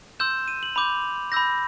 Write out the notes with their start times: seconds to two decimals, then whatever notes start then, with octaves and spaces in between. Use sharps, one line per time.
0.20 C6 E6 G6 E7
0.48 D#7
0.63 F#7
0.76 B5 D6 G6 F7
1.32 B5 E6 G6 A#6